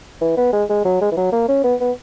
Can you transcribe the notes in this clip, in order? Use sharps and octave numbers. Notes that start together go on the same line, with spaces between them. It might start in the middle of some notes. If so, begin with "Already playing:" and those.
E3
B3
G#3
G#3
F#3
G#3
E3
F#3
A#3
C#4
B3
B3